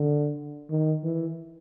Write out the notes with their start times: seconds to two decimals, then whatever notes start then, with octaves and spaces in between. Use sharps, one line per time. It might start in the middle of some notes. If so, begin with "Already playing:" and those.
Already playing: D3
0.70 D#3
1.04 E3